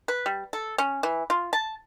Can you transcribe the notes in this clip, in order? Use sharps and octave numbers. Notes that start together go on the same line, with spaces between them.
B4
G3
A4
C#4
E3
F4
A5